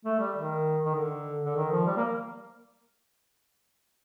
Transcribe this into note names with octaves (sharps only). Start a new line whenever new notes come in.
A3
G3
D#3
D#3
D3
D3
D#3
F3
G3
A#3